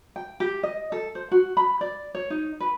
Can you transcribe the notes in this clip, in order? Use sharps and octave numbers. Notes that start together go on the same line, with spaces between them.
G5
G4
D#5
A4
C5
F#4
B5
D5
C#5
D#4
B4